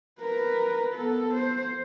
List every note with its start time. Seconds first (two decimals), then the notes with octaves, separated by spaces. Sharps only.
0.21 A#4 B4
0.94 B3 A4
1.34 C5